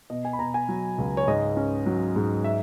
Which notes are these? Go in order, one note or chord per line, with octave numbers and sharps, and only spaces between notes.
B2 D#5
G#5
B5
B2 A#5
G#5
F#3
C#2
C#5
G#2 D#5
C#4
F#3
G#2
E5